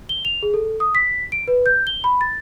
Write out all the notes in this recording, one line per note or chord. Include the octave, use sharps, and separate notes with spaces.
G7
F7
G#4
A4
D#6
B6
D7
B4
G6
G7
B5
A6